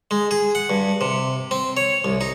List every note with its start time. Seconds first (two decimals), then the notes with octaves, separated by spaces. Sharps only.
0.11 G#3
0.31 G#4
0.55 F#5
0.70 G2
1.01 C3
1.51 C4
1.77 C#5
2.04 C2
2.21 D#4